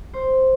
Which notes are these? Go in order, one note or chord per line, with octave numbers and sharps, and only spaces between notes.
C5